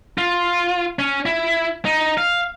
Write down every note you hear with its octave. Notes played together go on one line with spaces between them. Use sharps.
F4
C#4
E4
D#4
F5